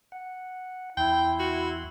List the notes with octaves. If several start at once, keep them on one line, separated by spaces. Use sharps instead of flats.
F#5
E2 E4 G5 C6
F#4